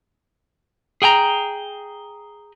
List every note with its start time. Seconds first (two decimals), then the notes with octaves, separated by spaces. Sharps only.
1.02 G#4 G5 G#5 A#5